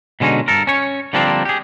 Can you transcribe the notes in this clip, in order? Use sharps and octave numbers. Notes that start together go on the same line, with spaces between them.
B2 D3 G#3 C#4 D#4
G2 A4 A#4
C#4 C#5
D3 F3 G3 A#3 C4 D4
G4 G#4